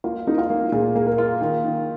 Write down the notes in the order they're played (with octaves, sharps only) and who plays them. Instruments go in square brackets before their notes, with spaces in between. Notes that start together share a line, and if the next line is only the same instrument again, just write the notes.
[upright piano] A#3 [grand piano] F4
[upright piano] A#3 [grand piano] D#4
[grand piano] F4
[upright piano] A#3
[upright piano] A#2 [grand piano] G#4
[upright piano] A#3 [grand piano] G#4
[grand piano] A#4
[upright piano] F4
D#3
D#3